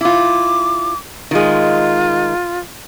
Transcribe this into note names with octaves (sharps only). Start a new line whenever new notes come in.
E4 F4 D6
D#3 G#3 F4